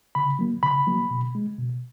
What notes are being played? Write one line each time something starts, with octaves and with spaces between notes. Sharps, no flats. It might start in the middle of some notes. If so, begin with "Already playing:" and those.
C#3 B5
F#3 A#3
C#3 B5
F#3 A#3
B2
G#3
B2